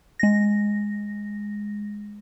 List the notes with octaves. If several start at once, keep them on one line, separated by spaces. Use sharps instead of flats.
G#3 A#6